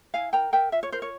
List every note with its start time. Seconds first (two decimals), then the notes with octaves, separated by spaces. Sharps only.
0.14 E4 F5 G#5
0.33 A#4 G5 A#5
0.53 A#4 E5 G5
0.72 F4 E5
0.83 C#5
0.92 A#4 C5
1.02 C#5